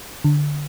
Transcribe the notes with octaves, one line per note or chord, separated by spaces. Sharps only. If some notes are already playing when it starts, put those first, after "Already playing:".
D3